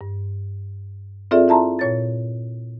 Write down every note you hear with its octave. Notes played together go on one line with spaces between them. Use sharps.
G2
C4 F4 G#4 A4 D5 E5
E4 E5 A5 A#5 C6
A#2 C#5 A6